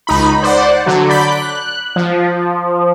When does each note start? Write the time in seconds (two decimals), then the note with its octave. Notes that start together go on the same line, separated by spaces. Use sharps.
0.07 C#2 D#4 B5
0.43 C5 D5 F#5
0.86 D3 F#3
1.09 D5 B5 G6 B6
1.30 F#6
1.96 F3